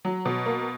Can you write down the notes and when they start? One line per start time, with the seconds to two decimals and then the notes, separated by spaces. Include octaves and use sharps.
0.05 F#3
0.25 B2
0.46 A#3